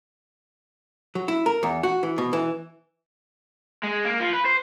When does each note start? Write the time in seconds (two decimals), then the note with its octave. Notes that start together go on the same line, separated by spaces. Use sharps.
1.15 F#3
1.28 E4
1.46 A#4
1.63 E2
1.83 F#4
2.03 E3
2.18 B2
2.33 E3
3.84 G#3
4.05 A#3
4.20 F3
4.33 B4
4.45 C5